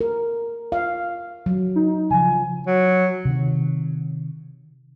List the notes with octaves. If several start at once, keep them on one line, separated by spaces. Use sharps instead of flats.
A#4
F5
F#3
D#4
C#3 F3 G#5
F#3
C3 D#3